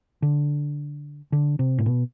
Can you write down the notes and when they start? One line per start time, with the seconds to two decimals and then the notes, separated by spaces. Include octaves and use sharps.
0.22 D3
1.32 D3
1.59 C3
1.78 A2
1.86 B2